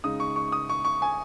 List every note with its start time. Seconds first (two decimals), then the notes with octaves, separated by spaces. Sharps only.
0.04 C#3 G#3 D#4 D#6
0.20 C#6
0.36 C#6
0.52 D#6
0.69 C#6
0.85 C#6
1.02 G#5